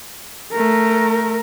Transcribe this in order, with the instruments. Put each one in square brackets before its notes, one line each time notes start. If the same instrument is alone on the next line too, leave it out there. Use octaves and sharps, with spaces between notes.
[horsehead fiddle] A3 A#4